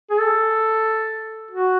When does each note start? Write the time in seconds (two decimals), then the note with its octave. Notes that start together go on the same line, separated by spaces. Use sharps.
0.11 G#4
0.20 A4
1.51 F#4